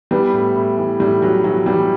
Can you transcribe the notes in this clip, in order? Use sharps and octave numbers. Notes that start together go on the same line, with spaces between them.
E3 G3 B3
A2
A2
E3
A2 G3
E3 F#3
E3 F#3
E3 G3